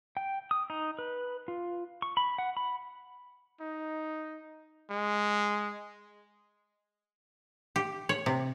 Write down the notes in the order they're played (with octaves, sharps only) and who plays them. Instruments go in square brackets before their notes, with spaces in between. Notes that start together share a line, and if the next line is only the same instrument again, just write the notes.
[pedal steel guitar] G5
D#6
D#4
B4
F4
C#6
B5
F#5
B5
[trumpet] D#4
G#3
[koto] G4
C#5
C3